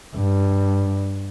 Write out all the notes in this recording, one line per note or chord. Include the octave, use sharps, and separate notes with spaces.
G2